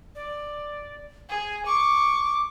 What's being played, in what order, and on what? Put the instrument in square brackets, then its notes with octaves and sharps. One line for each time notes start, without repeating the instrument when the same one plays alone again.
[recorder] D5
[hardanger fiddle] G#4 [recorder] G#5
[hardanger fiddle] C#6 [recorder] D6